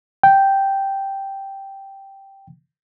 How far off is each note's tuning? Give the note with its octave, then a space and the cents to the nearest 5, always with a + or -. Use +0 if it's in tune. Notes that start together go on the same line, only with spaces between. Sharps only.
G5 -5